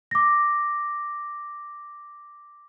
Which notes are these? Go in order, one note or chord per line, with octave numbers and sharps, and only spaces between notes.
D6 A#6